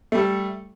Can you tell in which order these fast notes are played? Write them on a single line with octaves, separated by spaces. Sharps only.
A3 G3 A4